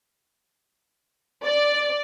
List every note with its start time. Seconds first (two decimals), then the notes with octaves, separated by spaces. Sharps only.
1.45 D5